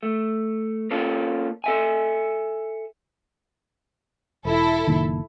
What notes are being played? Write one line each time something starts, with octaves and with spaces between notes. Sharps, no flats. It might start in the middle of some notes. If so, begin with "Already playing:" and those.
A3
A#3 C#4 F4 A4
A4 E5 G#5
E1 E4 A4
F#1 A#2 D#3